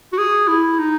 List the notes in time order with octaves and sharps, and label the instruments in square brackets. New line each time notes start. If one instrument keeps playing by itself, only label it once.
[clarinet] F#4
G#4
E4
D#4